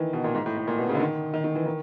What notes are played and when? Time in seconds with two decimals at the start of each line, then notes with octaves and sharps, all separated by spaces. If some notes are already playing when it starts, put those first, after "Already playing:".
Already playing: D#3 E3
0.13 B2
0.24 A#2
0.35 G#2
0.46 A2
0.57 A2
0.68 A#2
0.78 B2
0.89 C#3
0.95 D3
1.00 D#3
1.34 D#3
1.44 D#3
1.55 E3
1.66 D#3